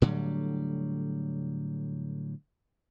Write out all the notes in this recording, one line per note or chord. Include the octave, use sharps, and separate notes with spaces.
A2 D3 F#3 G3